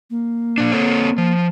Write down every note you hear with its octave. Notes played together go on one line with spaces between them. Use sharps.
A#3
A#2 D4
C4 A4 C#5
F3